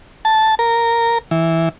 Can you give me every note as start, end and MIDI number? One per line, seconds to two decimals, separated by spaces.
0.25 0.55 81
0.59 1.18 70
1.31 1.69 52